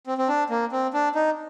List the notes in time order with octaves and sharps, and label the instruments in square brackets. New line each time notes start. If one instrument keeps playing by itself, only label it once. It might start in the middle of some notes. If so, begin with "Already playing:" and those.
[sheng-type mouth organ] C4
C4
D4
A#3
C4
D4
D#4